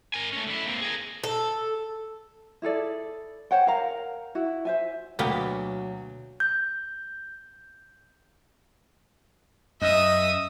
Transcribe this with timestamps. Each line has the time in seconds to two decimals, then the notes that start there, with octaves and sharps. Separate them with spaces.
0.14 A#4 G#5
0.33 A3 C#4
0.46 D3 E4
0.66 A#3 C4
0.81 G#4 A#4
1.24 A4
2.62 E4 G#4 A4 D5
3.51 C5 C#5 F#5 G5
3.67 A#4 F5 A#5
4.35 E4 F#4
4.65 C5 E5 G#5
5.19 D2 B2 F#3 A#3 B3 G4
6.40 G6
9.82 F#2 D#5 E5 D#6